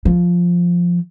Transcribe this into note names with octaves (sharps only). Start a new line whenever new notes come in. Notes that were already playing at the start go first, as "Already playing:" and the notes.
F3